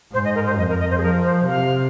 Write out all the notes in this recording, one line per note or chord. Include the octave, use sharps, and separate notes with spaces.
G#2 C5
D#5
A#4
C5
F2 D#5
A#4
D#5
C5
G#4
F3 A#4
C5
C3 F5